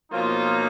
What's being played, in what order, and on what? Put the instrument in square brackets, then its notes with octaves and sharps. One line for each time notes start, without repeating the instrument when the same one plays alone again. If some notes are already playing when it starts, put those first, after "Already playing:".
[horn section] B2 F3 F#3 A#3 D#4 F4